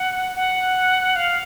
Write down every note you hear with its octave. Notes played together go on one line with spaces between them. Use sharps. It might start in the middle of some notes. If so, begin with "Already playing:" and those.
Already playing: F#5
F#5
F5